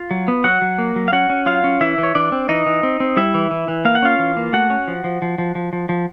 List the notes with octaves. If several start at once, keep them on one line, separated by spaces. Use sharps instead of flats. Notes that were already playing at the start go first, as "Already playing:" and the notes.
Already playing: F4 F5
F#3
B3
F#3 F#4 F#5
F#3
A#3
F#3
F5
C#4 F#4 F#5
C#4
F#3 F4 F5
C#4
E3 E4 E5
E3
C#5
E3 D4 D5
C4
E3 D#4 D#5
E3
C4
C4
G3 E4 E5
E3
E3
E3
A#3 F5
F#5
C#4 F4 F5
E3
A#3
A3 F#4 F#5
C#4
F3
F3
F3
F3
F3
F3
F3